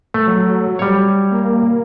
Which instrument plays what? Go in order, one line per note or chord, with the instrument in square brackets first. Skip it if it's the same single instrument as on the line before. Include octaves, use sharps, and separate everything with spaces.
[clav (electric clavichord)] A3
[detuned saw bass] F#3
[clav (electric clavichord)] G3 C#5
[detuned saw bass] A#3